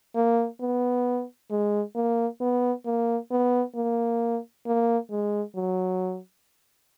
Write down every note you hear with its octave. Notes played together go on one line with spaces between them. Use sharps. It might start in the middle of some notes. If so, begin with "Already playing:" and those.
A#3
B3
G#3
A#3
B3
A#3
B3
A#3
A#3
G#3
F#3